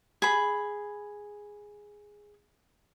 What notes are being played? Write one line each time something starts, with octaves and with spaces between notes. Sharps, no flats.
G#4 B5